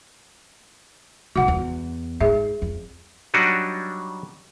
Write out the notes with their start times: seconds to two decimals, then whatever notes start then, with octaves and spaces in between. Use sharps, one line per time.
1.36 D#1 C2 F#4 F#5
1.48 E2
2.21 G#2 G#4 E5
2.62 F2
3.34 F#3 G3 D4 D#4 F#4